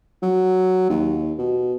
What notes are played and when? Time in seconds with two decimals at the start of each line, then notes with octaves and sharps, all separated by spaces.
0.22 F#3
0.90 D#2
1.39 B2